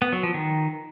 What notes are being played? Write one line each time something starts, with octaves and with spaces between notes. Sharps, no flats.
B3
F#3
F3
D#3